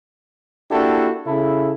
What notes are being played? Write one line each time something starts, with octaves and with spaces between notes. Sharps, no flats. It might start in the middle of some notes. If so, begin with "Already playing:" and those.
A#3 D4 E4 F#4 G4 A4
C#3 E4 A4